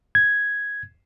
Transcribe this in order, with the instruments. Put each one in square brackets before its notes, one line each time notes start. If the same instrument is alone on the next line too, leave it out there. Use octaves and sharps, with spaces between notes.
[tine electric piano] G#6